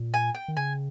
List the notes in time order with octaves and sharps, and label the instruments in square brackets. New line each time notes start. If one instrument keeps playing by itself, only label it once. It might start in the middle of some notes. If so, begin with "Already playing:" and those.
Already playing: [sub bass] A#2
[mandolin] G#5
G5
[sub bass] D#3
[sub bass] C#3 [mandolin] G#5